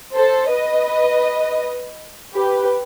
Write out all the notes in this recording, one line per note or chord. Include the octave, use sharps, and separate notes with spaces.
A4 C5
B4 D#5
G4 B4